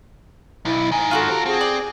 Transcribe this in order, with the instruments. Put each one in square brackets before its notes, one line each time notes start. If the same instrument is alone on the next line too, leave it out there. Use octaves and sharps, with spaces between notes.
[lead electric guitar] B1 [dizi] E4
[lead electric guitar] G#2 D#3 [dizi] G#5
[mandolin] F4 F#4 A4
[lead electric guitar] C4 A#4 [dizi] G4
[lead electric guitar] C4 [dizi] G#4
[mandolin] D5